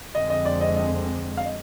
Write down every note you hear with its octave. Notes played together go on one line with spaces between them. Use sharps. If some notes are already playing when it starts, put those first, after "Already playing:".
F2 D3 G#3 C4 D#5
D#5
D5
D#5
D#5
F5
D#5